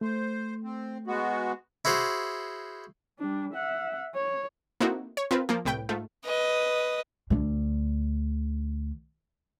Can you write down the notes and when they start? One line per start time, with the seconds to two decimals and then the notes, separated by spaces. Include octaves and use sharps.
0.01 A3 C5
0.64 C4
1.07 G#3 B3 F#4
1.85 E4 F#4 G#4 C5
3.19 G3 D4
3.54 E5 F#5
4.15 C#5
4.80 A#3 C4 D#4 E4 F#4 A4
5.17 C#5
5.31 C4 F4 A#4 B4
5.49 F3 A#3
5.65 C2 A2 B4 G5 D7
5.89 G#2 A3 F4
6.25 B4 D#5
7.30 D2 D3